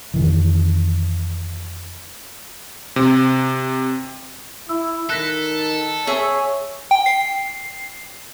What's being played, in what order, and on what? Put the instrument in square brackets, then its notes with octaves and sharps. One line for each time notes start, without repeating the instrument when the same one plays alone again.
[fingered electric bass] F2 D#3 E3
[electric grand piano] C3
[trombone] E4 [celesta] E6
[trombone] D#3 [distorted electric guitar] A4 [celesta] F#6 A#6 B6
[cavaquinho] G#4 E5 [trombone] C#5
[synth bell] G5
C7